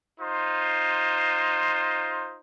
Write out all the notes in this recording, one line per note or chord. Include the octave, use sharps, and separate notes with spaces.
D#4 F4 C5